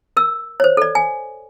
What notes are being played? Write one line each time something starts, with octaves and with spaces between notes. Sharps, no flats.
A#4 E6
C5 C#5
A4 D5
G#5